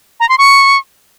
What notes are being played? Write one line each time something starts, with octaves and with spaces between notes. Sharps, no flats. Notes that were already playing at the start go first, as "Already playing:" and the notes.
A#5
C6
C#6